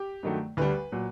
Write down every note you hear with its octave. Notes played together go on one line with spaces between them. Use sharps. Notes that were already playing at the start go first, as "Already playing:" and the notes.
Already playing: G4
G2 D#3 F#3 A3
D2 D3 G3 B4
A#2 F#3